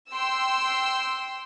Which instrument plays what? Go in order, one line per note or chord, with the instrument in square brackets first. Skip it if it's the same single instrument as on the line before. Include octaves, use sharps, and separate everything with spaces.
[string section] G5 C6 E6